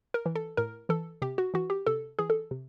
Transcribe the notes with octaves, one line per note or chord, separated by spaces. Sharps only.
A#4
E3
A4
A2 A#4
E3 A4
C3 G4
F#4
E3 F#4
G4
C3 A4
E3 G#4
A4
C3